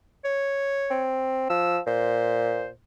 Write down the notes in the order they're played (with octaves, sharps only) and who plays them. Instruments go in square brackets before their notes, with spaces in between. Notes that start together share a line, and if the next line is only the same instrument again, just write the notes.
[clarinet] C#5
[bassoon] C4
[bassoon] F3 [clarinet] E6
[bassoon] A#2 [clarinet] C5